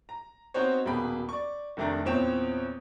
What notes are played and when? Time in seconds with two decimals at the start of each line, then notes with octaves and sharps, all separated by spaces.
0.09 A#5
0.54 B3 C4 D#4 F#4 C5 C#5
0.85 D#1 B2 A#3 G#4 G5 B5
1.29 D5 C#6
1.77 F1 D#3 A3 D4 G5 A#5
2.05 E2 A#2 C4 C#5 G5 E7